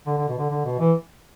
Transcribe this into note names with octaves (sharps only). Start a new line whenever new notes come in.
D3
D3
B2
D3
D3
B2
E3